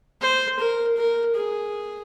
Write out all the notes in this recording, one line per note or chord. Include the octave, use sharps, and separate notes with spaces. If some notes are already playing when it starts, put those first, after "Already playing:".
C5
A#4
A#4
G#4